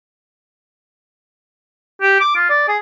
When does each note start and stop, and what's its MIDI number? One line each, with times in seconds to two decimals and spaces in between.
2.02 2.16 67
2.20 2.31 86
2.36 2.48 65
2.50 2.63 74
2.68 2.77 68